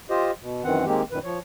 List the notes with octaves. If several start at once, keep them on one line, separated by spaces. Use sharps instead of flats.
F4 G4 C5 D#5
B2
F#2 D#3 E3 C4 F#5
D#3 G#3 A#3 C4 G4
F#2 A#2 D#3 B4
F3 C#5